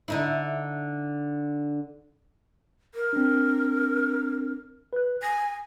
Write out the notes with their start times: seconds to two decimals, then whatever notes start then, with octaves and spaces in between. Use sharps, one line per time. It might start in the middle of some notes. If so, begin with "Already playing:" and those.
0.08 D3 D#4 E4
2.94 A#4
3.13 C4 D4
4.93 B4 F#6
5.23 G#5 A#6